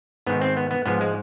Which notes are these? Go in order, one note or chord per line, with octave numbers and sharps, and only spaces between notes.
G#2 D#3 B3
C4
B3
B3
G#2 F3 B3
G#3